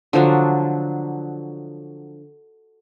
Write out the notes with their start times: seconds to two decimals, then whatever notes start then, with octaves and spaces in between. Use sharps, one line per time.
0.13 D3 F3 F#3 D4